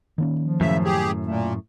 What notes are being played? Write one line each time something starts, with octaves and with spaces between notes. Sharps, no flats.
D#3 A#3 C#4
F3
F#2 A2 C#3 E5
G4 G#4
A#2 A3